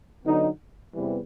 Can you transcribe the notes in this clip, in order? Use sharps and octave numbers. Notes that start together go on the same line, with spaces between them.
D3 F#3 B3 D#4
E2 C3 E3 G3 B3